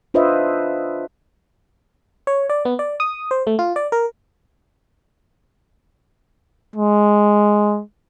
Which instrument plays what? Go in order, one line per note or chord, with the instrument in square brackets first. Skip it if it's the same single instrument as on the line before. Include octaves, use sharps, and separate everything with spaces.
[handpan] D4 F4 B4 C5 D#5 E5
[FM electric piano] C#5
D5
B3
D5
D#6
C5
A3
F4
D5
A#4
[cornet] G#3